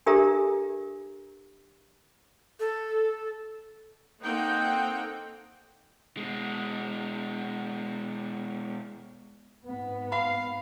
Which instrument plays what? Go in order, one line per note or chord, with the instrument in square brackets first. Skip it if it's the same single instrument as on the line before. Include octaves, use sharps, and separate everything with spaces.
[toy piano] D4 G4 A4 A#4 E5 A#5
[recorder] A4
[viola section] A#3 C4 D#4 A4 F#5 G5
[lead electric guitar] B2 G#3
[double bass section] G#2 B3
[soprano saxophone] F5 [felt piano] B5